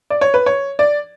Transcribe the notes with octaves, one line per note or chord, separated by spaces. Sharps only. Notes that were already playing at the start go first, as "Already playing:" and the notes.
D5
C#5
B4
C#5
D5